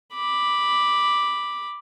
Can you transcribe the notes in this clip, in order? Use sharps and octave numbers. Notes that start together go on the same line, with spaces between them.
B5 D6